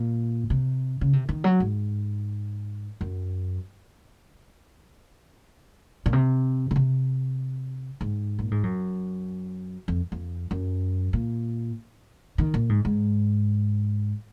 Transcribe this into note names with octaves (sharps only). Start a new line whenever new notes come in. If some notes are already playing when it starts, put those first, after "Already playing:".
Already playing: A#2
C3
C#3
C3
D#3
F#3
G#2
F#2
A#2
C3
C#3
C3
G#2
A#2
G#2
F#2
F2
F2
F#2
A#2
D#3
A#2
G#2
G#2